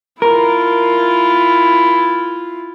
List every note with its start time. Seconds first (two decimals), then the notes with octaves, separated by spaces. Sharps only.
0.22 E4 F4 A#4